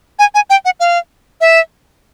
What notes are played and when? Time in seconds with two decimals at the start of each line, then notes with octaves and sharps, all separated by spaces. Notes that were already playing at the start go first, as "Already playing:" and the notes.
0.19 G#5
0.35 G#5
0.50 G5
0.65 F#5
0.80 F5
1.41 E5